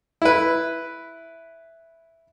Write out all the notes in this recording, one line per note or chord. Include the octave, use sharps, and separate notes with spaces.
E4 B4